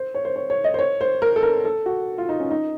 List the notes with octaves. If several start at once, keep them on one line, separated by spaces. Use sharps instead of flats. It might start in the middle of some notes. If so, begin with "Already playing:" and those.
Already playing: C5
C#5
C5
C#5
C#5
D#5
C5
C#5
C5
A#4
A4
A#4
A4
F#4
F4
D#4
C#4
D#4